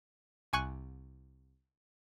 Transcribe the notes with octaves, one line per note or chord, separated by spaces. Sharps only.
C2 G#5 C#6 F#6